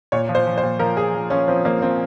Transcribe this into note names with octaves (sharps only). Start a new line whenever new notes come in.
A#2 C#5
F3
C5
F3
C5
A#2
F3 A#4
F3 G#4
F3
F3 C#4
F3 C4
F3 A#3
F3 C4